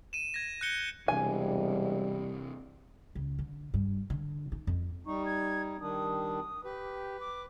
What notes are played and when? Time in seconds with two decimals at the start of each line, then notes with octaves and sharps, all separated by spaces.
0.13 D#7 E7
0.34 G#6 A#6
0.61 F#6 G6 C#7 G7
1.08 E1 C3 E3 G3 D4 G#5
3.15 C#2
3.39 D3
3.74 G2
4.10 D3
4.52 D#4
4.67 F2
5.06 G3 D#4 C#6
5.26 G#6
5.81 D#3 G3 D4 D#6
6.64 G4 B4
7.20 D6